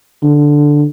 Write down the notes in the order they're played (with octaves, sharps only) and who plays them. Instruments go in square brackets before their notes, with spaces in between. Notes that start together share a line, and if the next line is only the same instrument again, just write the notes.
[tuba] D3